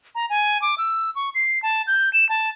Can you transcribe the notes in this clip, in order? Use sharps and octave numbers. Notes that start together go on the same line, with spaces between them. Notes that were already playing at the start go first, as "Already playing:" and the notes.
A#5
G#5
D6
E6
C#6
C7
A5
G6
E7
A5